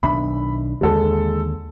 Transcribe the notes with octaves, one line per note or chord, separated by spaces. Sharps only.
B1 D#3 D4 E5 B5
D#2 D3 G#3 A4